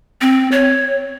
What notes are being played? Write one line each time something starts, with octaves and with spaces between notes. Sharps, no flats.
C4
C#5